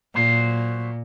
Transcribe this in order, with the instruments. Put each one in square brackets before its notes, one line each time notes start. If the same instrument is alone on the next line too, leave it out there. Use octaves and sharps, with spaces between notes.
[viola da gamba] A#2 [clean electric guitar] F#3 C5